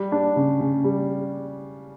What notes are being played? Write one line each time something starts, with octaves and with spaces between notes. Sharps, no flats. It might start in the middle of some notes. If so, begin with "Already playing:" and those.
Already playing: G3
D4
C#3
C#3
G3